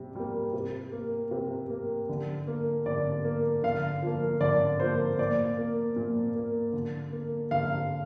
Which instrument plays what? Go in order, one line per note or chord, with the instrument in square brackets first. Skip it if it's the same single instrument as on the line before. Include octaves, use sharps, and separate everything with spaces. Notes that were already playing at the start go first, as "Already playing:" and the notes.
Already playing: [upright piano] C3 G3
G3 A#3
C3
A#3
C3
A#3
D3
A#3
D3 D5
A#3
D3 F5
F3 A#3
D3 D5
F3 A#3 C5
A#2 D5
A#3
A#2
A#3
D3
A#3
D3 F5